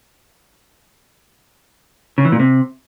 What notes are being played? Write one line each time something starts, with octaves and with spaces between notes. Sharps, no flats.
C#3
E3
A#2
C3